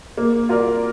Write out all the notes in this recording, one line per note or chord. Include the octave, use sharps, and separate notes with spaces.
A#3
F4 A#4 D5